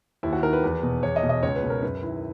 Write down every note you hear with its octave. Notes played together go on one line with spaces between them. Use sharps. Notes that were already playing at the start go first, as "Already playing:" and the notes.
D#2 E4
F#4
D#3 A#4
B4
E2
B2
E2 C#5
D#5
B2
D#5
C#2 C#5
B4
B2
A#4
F#2 B4
D#3 E4